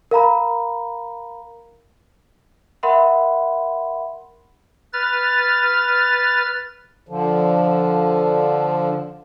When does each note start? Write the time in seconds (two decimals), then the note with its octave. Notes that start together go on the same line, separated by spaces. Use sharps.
0.11 A#4 F5 A#5 B5
2.83 A#4 E5 F#5 B5 C6
4.93 B4 F6 A6
7.09 D3 F3